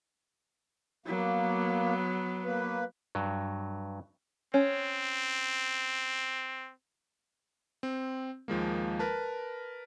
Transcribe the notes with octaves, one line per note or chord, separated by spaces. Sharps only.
F#3 A#3 B3
A#3 B4
G2 F#3
C4 C#4
C4
D#2 F3 G#3 A#3
A#4 B4 A5